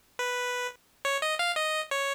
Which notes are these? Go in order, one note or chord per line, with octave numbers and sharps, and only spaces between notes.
B4
C#5
D#5
F5
D#5
C#5